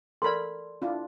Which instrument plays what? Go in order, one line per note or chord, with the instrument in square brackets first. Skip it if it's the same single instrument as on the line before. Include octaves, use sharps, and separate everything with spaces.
[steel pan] A4 A#4 B5 [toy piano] D5 C6
[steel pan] D4 E4 F4